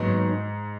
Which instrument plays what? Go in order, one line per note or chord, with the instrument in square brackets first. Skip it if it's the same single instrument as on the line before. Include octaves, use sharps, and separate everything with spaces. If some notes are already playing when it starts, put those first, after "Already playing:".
Already playing: [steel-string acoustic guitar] D#2 D#3 F#3 B3 D#4 [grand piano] G#2